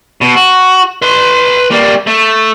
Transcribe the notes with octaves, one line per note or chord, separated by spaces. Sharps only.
B2
F#4
B4 C6
G3 A#3
A3